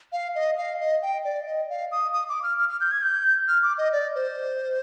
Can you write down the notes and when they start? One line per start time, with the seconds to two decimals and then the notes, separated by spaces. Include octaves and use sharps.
0.12 F5
0.35 D#5
0.58 F5
0.80 D#5
1.02 G5
1.25 D5
1.46 D#5
1.70 F5
1.92 D#6
2.13 D#6
2.29 D6
2.43 F6
2.59 F6
2.69 F6
2.81 G6
2.92 G#6
3.03 G6
3.48 F6
3.63 D6
3.78 D#5
3.92 D5
4.15 C5